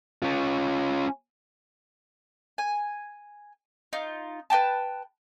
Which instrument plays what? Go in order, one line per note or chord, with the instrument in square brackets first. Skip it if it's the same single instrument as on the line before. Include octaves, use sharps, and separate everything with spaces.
[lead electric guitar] C#4 F4
[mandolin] G#5
D#4 F4
B4 D#5 G5 A5